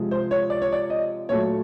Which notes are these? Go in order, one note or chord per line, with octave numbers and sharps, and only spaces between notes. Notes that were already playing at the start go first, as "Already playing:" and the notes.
Already playing: C3 F3 G#3
C5
C#5
D5
C#5
D5
D#5
A#2 F#3 A3 C#5